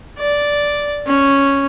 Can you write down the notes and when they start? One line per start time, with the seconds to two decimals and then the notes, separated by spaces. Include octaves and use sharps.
0.18 D5
1.07 C#4